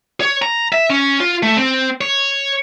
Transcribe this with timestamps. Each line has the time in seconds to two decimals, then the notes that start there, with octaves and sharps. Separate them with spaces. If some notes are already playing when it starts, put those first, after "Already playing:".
0.21 C#5
0.42 A#5
0.73 E5
0.90 C#4
1.20 F4
1.43 A3
1.57 C4
2.01 C#5